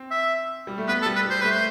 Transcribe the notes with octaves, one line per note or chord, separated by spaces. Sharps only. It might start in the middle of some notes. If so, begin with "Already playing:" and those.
Already playing: C4
E5
G3
A3
B3 B4
A4
G3
B4
G3 C5
A3 B4
C5